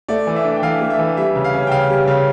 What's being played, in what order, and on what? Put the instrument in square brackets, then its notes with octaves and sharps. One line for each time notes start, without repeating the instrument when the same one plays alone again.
[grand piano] A3 D5
E3
E5
D4
G5
E3 F5
A3
E5
E3
G3 E5
C#3
F5
C#4
G5
C#3 F5
G3
C#3